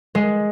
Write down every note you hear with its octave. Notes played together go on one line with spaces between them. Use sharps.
G#3